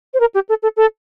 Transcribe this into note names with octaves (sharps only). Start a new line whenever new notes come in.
C5
A#4
G4
A4
A4
A4